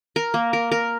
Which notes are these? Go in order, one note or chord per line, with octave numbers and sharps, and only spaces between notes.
A#4
A#3
A#4
A#4